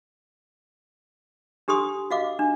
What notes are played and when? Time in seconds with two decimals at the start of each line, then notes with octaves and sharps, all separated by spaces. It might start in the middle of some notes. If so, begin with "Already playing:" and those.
1.68 D4 G4 A4 C6 D#6
2.11 F#4 D#5 F5 F#5 D6
2.39 D4